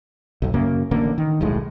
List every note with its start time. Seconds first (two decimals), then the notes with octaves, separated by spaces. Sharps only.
0.42 B1 F#2
0.54 F#2 C#3 A#3
0.91 A1 D3 A#3
1.18 D#3
1.41 D#1 B1 A2 G#3